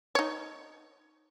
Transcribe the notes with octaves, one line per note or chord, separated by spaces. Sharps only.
D#4 C#5